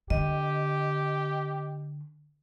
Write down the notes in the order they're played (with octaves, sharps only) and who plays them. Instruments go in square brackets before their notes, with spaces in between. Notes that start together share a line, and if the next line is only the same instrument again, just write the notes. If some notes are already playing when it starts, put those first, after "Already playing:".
[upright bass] D3 [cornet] G4 [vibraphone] D#5